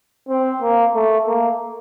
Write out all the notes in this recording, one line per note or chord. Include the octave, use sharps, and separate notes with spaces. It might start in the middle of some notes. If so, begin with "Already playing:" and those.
C4
A#3
A3
A#3